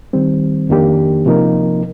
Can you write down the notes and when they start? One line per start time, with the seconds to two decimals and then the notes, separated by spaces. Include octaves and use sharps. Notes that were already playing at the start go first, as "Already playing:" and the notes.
0.13 D#3 G3 C4
0.69 F2 D#3 A#3 D4 G4
1.26 C3 F3 A#3 D#4 A#4